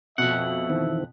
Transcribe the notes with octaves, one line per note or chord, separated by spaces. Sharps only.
F2 B2 E5 F#5
D#3 E3 C4